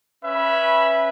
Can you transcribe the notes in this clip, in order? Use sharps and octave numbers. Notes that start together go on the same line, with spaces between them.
C#4 B4 E5 B5